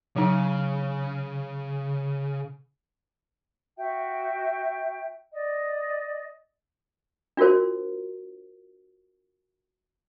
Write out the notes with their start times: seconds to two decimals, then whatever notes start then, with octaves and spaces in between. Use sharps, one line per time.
0.16 C#3 F#3 D#4
3.78 F#4 E5 G5
5.33 D5 D#5
7.37 D4 F4 F#4 A#4 C5